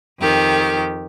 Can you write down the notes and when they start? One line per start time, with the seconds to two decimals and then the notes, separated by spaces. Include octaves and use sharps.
0.20 F2 D#3 G4